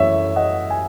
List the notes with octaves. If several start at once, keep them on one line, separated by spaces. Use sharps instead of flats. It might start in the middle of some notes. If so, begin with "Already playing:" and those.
Already playing: F#2 E3 A3 C#5 E5
D#5 F#5
G#5